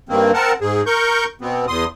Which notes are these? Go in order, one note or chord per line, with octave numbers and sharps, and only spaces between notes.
G2 D#3 A#3 C4
C4 A#4 F#5 A5
G#2 G#4
A#4 C#6 G6
B2 B3 C4
E2 C6 D#6